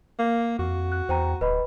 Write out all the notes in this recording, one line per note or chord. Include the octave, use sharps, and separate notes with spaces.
A#3
F2 F#4
F#6
E2 C5 G5 A#5
D1 B4 D#5 B5